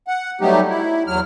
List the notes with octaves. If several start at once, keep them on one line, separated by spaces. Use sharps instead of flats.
F#5
F#3 G3 A3 B3 D#4 G4
E4
E2 F#3 F6